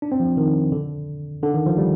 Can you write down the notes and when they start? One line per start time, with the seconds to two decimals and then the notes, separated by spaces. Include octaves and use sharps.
0.02 D4
0.12 C4
0.20 F3
0.37 D#3
0.72 D3
1.43 D3
1.54 D#3
1.66 F3
1.78 G3